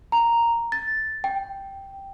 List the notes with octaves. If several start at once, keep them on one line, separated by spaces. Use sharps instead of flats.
A#5
A6
G5